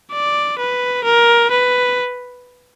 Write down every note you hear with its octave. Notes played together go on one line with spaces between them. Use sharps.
D5
B4
A#4
B4